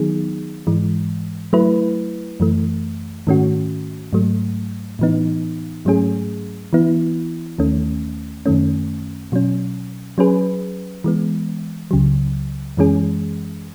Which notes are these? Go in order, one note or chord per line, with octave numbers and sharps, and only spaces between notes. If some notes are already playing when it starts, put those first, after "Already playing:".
Already playing: D#3 F#3 B3 D#4 G#4
G#2 E3 G#3
F#3 A3 E4 B4
F#2 E3 A3
G#2 D#3 A3 C#4 F#4
G#2 F#3 A3
A2 E3 B3 D#4
G#2 F#3 A3 C#4 G#4
E3 B3 E4
D#2 D#3 A3 C#4
F#2 D#3 A3 C#4
B2 F#3 C#4
F#3 C#4 G#4 B4
E3 G#3 B3
C#2 C#3 F#3
F#2 E3 G#3 C#4 G#4